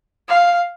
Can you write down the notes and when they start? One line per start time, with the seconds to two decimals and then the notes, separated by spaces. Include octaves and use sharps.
0.29 F5